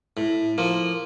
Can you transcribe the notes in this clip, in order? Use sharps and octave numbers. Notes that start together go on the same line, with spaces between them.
A2
F3 A#3